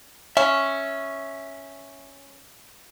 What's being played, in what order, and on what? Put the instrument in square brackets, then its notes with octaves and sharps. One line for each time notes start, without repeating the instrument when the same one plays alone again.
[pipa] C#4 [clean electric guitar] E5